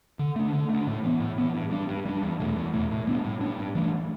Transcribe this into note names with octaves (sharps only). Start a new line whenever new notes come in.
D3
A3 D4
D3
A3 D4
A2
E3 B3
A2
E3 B3
G2
G3 D4
G2
G3 D4
E2
B2 A3
E2
B2 A3
A2
G3 B3 D4
A2
G3 B3 D4
G2
E3 A3 D4